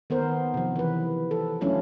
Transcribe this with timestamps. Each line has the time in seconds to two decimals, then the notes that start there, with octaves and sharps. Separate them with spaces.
0.10 D#3 B3 A#4 C5
0.54 C3 F3
0.76 E3 B4
1.31 A4
1.61 F#3 A3 C#4 D4 E4 F4